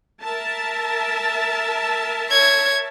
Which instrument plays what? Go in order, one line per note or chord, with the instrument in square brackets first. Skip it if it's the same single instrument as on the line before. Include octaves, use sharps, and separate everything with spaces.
[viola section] A#4 E5 A5
[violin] C#5 G#6